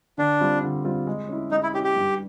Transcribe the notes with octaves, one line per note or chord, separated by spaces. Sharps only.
D3 D4
G3 C4 F4
D3
G3 C4 F4
G#3
C#4 E4
G#3 D#4
E4
C#4 E4 G4
G4
G2